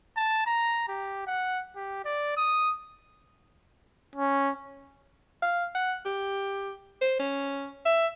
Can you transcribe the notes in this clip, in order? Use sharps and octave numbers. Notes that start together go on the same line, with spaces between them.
A5
A#5
G4
F#5
G4
D5
D#6
C#4
F5
F#5
G4
C5
C#4
E5